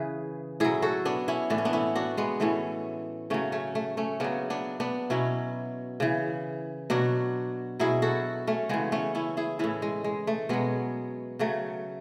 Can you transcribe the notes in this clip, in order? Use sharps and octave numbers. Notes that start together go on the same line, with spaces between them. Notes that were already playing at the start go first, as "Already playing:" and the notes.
Already playing: C#3 E3 G#4 B4
A2 F#3 E4 G#4
F#4 A4
B3 D4
C#4 E4
A2 E3 D4
C#4
B3 D4
C#4 E4
D4 F#4
G#3 B3
A2 E3 A3 C#4
C#3 F#3 A3 C#4
A3 C#4
A3
A3 C#4
C#3 F#3 B3 D4
B3 D4
B3 D4
B2 F#3 C#4 E4
C#3 E3
B2 F#3 D4 F#4
B2 F#3 E4 G#4
F#4 A4
A3 C#4
C#3 E3 G#3 B3
A3 C#4
C#4 E4
E4 G#4
A2 E3 C#4 E4
G#3
G#3
A3
B2 F#3 G#3 B3
C#3 F#3 A3